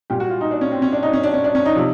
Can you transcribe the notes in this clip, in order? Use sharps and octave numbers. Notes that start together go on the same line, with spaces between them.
A#2 G3 G4
F#4
F4
D#4
D4
C#4
C4
C#4
D4
D#4
C#4
D4
C#4
D4
C#4
D#4
C3 F3